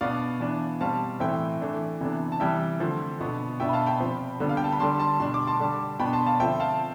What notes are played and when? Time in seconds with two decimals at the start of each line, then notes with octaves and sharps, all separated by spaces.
0.01 B2 B3 D4 D5 F5
0.40 E3 B3 D4
0.81 B2 G3 C4 F5 A5
1.20 A2 E3 A3 C4 E5 G5
1.61 E3 A3 D4
2.01 C3 E3 B3 D4
2.32 A5
2.40 C3 E3 G3 E5 G5
2.80 D3 F3 A3 C4
3.20 B2 B3 D4
3.60 B2 B3 D4 E5 G5
3.69 B5
3.73 F5 A5
3.86 G5 B5
4.00 C3 F3 C4
4.40 D3 G3 B3 D4
4.49 F5
4.57 G5
4.64 A5
4.72 B5
4.80 D3 G3 D4 A5 C6
4.99 A5 C6
5.20 B2 G3 D4 C6
5.34 D6
5.47 A5 C6
5.59 D3 G3 D4
6.00 B2 B3 D4 G5 B5
6.13 A5 C6
6.26 F5 A5
6.40 D3 F3 C4 E5 G5
6.60 F5 A5